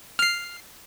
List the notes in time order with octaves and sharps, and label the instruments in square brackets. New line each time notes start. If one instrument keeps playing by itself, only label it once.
[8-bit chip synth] F6 C7